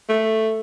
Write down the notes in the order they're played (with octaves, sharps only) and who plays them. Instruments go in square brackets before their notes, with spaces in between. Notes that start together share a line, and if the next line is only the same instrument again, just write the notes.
[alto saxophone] A3